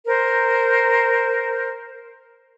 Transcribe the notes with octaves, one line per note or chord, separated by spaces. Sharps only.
A#4 C5